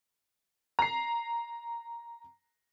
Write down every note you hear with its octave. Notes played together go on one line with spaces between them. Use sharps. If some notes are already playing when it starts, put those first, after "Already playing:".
A#5 C7